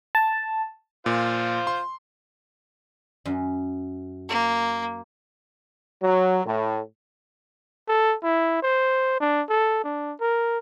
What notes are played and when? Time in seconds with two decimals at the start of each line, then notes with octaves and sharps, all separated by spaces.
0.15 A5
1.06 A#2 F4 C5
1.67 C6
3.25 F#2
4.29 A#3
6.03 F#3
6.45 A2
7.88 A4
8.23 E4
8.62 C5
9.20 D4
9.49 A4
9.84 D4
10.20 A#4